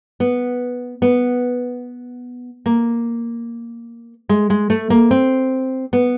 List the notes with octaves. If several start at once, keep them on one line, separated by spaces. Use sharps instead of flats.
B3
B3
A#3
G#3
G#3
A3
A#3
C4
B3